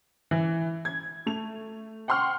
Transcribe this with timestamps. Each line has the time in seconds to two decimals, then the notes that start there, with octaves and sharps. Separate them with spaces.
0.31 E3
0.85 G#6
1.26 A3 F7
2.08 F#5 G5 C6 C#6 F6